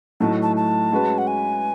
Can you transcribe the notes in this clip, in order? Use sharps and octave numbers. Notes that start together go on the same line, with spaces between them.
A2 F#3 A3 D#4 F#4 A5
A5
A5
G#3 C#4 F#4 B4
F#5
G#5